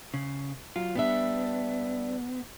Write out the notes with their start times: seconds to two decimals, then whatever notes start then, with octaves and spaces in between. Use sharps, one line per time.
0.14 C#3
0.76 F#3 F4
0.95 G3 B3 D4 E5